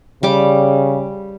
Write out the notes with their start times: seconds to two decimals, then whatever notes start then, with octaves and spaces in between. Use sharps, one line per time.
0.23 C#3 G3 D6